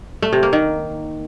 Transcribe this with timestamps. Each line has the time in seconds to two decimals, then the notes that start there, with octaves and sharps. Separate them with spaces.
0.22 A3
0.33 C3
0.43 A#3
0.53 D#3